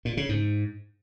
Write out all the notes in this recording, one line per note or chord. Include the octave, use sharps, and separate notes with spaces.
A#2
C#3
G#2